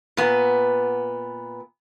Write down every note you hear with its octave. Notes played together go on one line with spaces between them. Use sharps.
A#2 B3